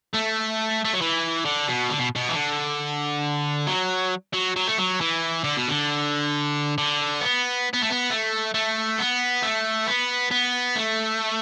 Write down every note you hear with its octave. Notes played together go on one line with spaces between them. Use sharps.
A3
A3
F#3
E3
D3
B2
D3
B2
B2
E3
D3
F#3
F#3
F#3
A3
F#3
E3
D3
B2
D3
D3
B3
B3
A3
B3
A3
A3
B3
A3
B3
B3
A3